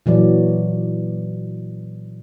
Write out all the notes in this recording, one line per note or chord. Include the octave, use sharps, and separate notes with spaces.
A#2 E3 F#3 D5